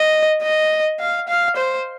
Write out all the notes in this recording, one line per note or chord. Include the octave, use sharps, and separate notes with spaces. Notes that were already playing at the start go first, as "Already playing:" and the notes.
Already playing: D#5
D#5
F5
F5
C5